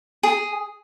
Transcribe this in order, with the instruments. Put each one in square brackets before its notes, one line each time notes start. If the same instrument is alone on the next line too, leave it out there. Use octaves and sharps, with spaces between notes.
[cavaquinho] G#4